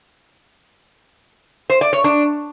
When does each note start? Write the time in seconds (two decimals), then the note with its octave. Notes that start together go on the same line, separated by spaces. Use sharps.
1.70 C5
1.81 D5
1.93 C#5
2.04 D4